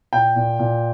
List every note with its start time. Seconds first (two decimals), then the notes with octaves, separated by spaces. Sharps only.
0.13 A#2 G5
0.36 A#2
0.59 A#2